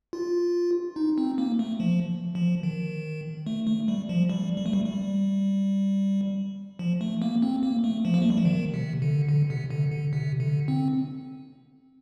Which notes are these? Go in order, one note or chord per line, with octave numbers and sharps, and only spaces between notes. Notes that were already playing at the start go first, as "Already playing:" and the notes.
F4
D#4
C4
A#3
A3
F3
F3
D#3
A3
A3
G3
F3
G3
G3
A3
G3
G3
F3
A3
A#3
C4
A#3
A3
F3
A#3
A3
G3
F3
D#3
C3
D3
D3
C3
D3
D3
C3
D3
C4